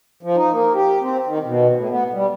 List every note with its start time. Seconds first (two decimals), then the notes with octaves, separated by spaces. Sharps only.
0.23 F3
0.36 D#4
0.52 A#3
0.74 G4
1.01 C4
1.26 D#3
1.44 B2
1.76 A2
1.90 B3
2.12 G3